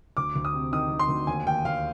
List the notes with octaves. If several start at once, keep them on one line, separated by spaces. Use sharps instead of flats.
D2 D6
D2
D#6
C3
D#3 D#6
D#3
C6
D2
D#2 G#5
D#2 G5
D#2 F5